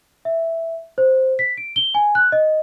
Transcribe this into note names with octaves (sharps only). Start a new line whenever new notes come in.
E5
C5
B6
D7
G7
G#5
F#6
D#5